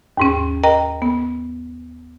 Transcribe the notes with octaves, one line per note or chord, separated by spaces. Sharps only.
D#2 G#2 C#4
A#4 D#5 G5 A#5
B3